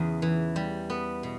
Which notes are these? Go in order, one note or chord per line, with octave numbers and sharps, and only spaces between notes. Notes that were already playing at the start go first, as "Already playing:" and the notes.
Already playing: E2 C#3
E3
G3
B3
B2